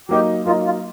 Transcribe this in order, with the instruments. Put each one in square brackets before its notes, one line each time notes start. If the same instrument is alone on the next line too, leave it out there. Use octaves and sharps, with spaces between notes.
[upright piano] F#3 A#3 D#4 [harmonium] G4
[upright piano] F#3 A#3 D#4 [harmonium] F4
[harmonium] F4